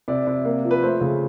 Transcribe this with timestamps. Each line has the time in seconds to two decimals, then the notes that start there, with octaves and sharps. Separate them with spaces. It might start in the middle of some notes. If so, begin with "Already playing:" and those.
0.08 C3 D5
0.27 C3
0.45 A#3
0.64 F3
0.71 B4
0.82 A3 C5
1.01 C#3